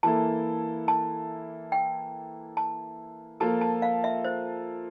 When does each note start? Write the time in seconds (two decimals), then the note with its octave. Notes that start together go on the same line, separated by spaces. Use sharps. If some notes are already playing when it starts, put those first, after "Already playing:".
0.03 E3 A#3 E4 A4 A5
0.88 A5
1.72 G5
2.57 A5
3.40 F3 A#3 F4 A4 A5
3.61 A5
3.82 F5
4.04 E5
4.24 C5